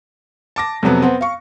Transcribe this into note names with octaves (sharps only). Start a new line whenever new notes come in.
A5 D6 A#6
F2 C3 F#3 B3
B3 C4
F5 C#6